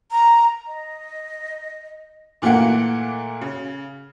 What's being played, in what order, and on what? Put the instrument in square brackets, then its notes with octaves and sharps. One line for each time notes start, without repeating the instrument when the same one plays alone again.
[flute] A#5
D#5
[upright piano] A#2 E3 A3 A#3 F#5
C#3